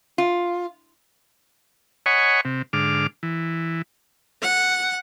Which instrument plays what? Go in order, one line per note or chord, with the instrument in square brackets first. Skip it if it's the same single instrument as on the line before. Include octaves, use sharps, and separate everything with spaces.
[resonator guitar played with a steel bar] F4
[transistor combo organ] C#5 D#5 F#5 G#5 B5 C#6
C3
G#2 D3 D6 F6
E3
[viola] F#5